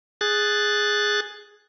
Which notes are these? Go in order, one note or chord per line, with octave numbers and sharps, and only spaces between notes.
G#4 F#6 A6